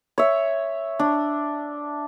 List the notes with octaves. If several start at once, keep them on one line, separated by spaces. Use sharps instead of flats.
C#5 E5
D4